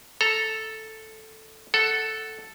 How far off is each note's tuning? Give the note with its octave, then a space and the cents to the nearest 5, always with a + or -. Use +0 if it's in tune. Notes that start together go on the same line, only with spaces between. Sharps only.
A4 +0 A#5 +0
A4 +0 F#5 +15